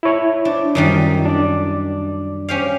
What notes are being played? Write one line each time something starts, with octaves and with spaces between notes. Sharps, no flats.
E4 C#5
D4
F#2 D#3 G3
D4 D5
C#4 G4 F5